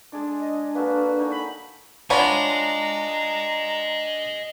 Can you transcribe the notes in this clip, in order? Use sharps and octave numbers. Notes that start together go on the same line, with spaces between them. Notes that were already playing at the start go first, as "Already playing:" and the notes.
G#3 D4 G#4 D5
D#5
A#3 F#4 A4 B4
D#4 G#4 C#5
B5
D4 F4 C#5 D#5 F#5 G#5 A#5 B5